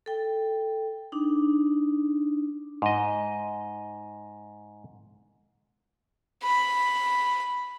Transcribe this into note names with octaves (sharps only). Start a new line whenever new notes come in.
A4 G5
D4 D#4
G#2 D#5
B5